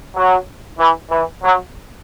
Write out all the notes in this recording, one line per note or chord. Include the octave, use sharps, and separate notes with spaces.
F#3
E3
E3
F#3